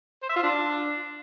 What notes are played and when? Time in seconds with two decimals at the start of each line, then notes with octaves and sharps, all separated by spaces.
0.22 C5
0.29 E5
0.36 F4
0.43 D4